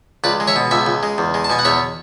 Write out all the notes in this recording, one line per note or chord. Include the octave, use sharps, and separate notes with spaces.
C#2 B4 D5
G#3
C#5 E5
B2
C#2 E5 G#5
C#2
G#3
E2
G#3
A5
B2 G#5
F#5
E2 C#5 E5